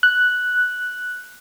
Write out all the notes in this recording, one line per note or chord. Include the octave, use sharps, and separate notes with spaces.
F#6